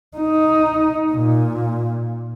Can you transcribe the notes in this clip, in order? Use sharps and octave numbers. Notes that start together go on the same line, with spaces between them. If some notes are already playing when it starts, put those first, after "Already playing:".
D#4
A#2